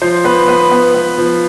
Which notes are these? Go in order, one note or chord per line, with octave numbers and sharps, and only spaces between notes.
F3 C5
B3 B4
B3 B4
B3
B3
F3